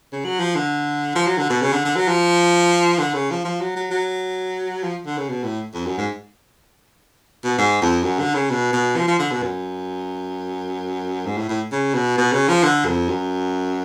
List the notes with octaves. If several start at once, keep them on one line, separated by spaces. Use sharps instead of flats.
C#3
F#3
F3
D3
F3
F#3
D3
B2
C#3
D3
D3
F#3
F3
D3
C#3
F3
F3
F#3
F#3
F#3
F3
D3
C#3
B2
A2
F2
F#2
G#2
B2
G#2
F2
F#2
D3
C#3
B2
B2
F3
F3
D3
B2
F#2
G#2
A2
A2
C#3
B2
B2
C#3
F3
D3
F2
F#2